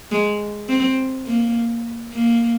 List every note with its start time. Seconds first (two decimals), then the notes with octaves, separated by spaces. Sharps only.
0.11 G#3
0.68 C4
1.26 A#3
2.13 A#3